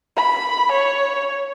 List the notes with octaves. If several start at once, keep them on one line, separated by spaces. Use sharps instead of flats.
B5
C#5